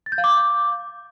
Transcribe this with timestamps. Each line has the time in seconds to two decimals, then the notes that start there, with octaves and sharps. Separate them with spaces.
0.06 A6
0.12 G6
0.18 F5
0.24 D6